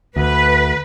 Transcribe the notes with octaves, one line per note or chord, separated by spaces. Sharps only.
D2 B4